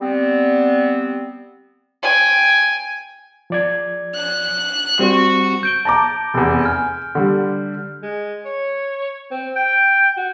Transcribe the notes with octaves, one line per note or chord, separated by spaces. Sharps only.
G3 B3 C4
G5 G#5
F3 D5 G#6
F#6
G3 C4 F#4
G6 D7 G7
A5 A#5 D6
F1 E2
G#5 F6
D3 G3
G#3
C#5
C4
G5
F#4